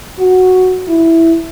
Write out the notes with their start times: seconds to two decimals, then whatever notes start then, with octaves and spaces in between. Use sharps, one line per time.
0.20 F#4
0.88 E4